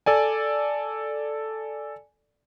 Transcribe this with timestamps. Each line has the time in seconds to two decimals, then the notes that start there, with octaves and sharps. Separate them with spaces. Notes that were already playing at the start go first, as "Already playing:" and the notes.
0.06 A4 D5 G#5